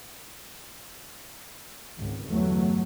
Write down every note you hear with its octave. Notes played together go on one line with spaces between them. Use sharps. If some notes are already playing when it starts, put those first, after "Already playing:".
G#1 C#2
G1 E2 F#3 A3